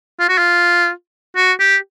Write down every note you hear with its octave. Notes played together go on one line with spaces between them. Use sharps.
F4
F#4
F4
F#4
G4